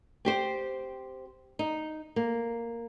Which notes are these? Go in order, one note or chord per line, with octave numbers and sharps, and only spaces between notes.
C4 G4 C5
D#4
A#3